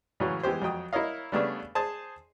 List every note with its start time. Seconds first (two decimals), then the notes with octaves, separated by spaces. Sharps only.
0.20 A2 C#3 E3 F#3
0.43 E3 G#3 B3 G4 C5
0.62 F2 F#3 G5 D#6
0.93 E4 A#4 C#5 D#5 F5
1.32 C#3 G3 A3 B3 D4 G#4
1.75 G#4 C5 A5